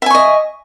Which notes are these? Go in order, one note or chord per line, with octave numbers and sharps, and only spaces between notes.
D#5 E5 G#5 C#6